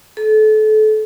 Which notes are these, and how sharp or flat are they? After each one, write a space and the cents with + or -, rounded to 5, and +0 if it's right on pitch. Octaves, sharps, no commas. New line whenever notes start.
A4 -30